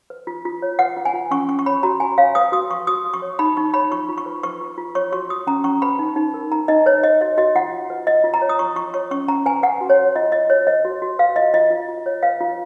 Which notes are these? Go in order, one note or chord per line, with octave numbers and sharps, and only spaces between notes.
B4
F4
F4
C#5
B4 F#5
F4
G#5
F4
C#4 C#6
C#4 C#6
C#6
C#5 B5
F#4 A#5
F#4 G#5
C#5 F5
B4 D#6
F#4 D#6
F#4 C#6
F#4 D#6
F#4
C#6
C#5
D#4 B5
D#4 C#6
C#5 B5
F4 C#6
F4
C#6
B4
B4 C#6
F4
F4
C#5 C#6
F#4 C#6
F#4 D#6
C#4 A#5
C#4 C#6
B4 B5
D#4
D#4
A#4
D#4 A#5
D#4 D#5
B4 C#5
C#5 D#5
F#4 D#5
F#4 D#5
F4 F#5
F4
B4
F4 D#5
F4
A#5
C#5
D#6
F4 C#6
F4 C#6
C#5 C#6
C#4 C#6
C#4 A#5
B4 G#5
B4 F#5
F#4
C#5
F#4
F4 D#5
F4 D#5
C#5
B4 D#5
F#4
F#4
B4 F5
F4 D#5
F4 D#5
F4
F4
C#5
B4 F5
F4